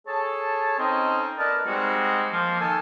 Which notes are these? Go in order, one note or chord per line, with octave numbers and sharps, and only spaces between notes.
G#4 A4 C#5 A5
C4 C#4 D#4 A4 D#5
A#4 B4 D5 D#5 A5
G3 G#3 C4 D#4 F#4
F3 A#3 F4
D#3 A4 G#5 A5 E6